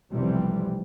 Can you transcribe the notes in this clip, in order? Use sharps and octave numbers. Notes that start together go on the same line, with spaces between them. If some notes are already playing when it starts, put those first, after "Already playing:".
F1 B1 C3 E3 G3 C4